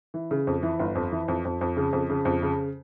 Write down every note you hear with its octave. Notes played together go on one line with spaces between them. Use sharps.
E3
C#3
F2
E3
G1
F2
E3
F2
F2
F2
C#3
F2
C#3
F2
C#3